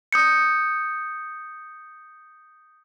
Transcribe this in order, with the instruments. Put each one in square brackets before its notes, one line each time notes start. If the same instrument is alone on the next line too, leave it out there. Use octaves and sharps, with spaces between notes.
[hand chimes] D#6 G6 C#7